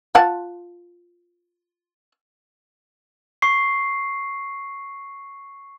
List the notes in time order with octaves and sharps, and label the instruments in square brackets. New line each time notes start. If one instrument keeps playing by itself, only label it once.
[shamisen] F4 F#5 A5
[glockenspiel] C#6 C7